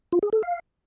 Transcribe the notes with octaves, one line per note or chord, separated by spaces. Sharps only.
F4
G#4
A4
F5